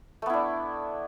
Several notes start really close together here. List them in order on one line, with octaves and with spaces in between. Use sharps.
A3 B3 E4 D4